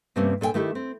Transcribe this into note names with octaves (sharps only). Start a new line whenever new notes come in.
G2 C3 A3 A#3 C4 C#4
A#2 A4 C5 G5 G#5
D#3 A3 E4 G4 A4
C4